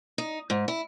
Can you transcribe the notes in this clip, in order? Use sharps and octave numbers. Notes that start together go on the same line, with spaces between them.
D#4
G#2
E4